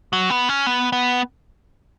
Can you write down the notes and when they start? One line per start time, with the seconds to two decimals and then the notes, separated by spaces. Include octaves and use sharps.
0.13 F#3
0.30 B3
0.49 C#4
0.66 B3
0.92 B3